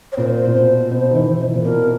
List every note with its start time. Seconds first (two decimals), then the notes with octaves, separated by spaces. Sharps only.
0.12 C#5
0.17 A#2 C5
0.47 A#2
0.54 B2
0.91 B2
1.11 D#3
1.15 E3
1.40 E3
1.54 A#2
1.61 A4
1.64 B2 A#4